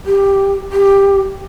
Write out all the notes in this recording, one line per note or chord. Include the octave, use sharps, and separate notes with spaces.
G4
G4